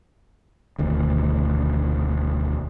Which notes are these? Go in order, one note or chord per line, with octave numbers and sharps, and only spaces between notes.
E1 D2 D#3